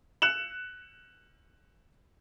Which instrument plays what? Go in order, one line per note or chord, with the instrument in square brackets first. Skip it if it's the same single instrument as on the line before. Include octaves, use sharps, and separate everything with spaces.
[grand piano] F#6 C#7 E7 F#7